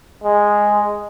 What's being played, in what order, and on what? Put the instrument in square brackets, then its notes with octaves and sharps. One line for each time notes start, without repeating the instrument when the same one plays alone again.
[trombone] G#3